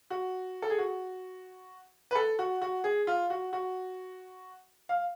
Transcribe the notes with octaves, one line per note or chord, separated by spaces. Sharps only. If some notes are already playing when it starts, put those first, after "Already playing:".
F#4
A4
G#4
F#4
B4
A4
F#4
F#4
G#4
F4
F#4
F#4
F5